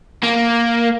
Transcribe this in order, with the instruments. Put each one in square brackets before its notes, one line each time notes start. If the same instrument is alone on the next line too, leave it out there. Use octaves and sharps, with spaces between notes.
[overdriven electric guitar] A#3